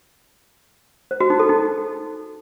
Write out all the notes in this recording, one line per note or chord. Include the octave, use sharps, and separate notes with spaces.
C5
F#4
D#4
A4
D#4